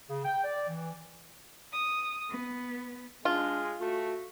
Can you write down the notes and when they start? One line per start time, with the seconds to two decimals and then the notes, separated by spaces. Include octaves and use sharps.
0.10 C#3
0.25 G5
0.44 D5
0.69 E3
1.72 D#6
2.30 B3
3.25 G#3 D4 F4
3.80 A3 F#4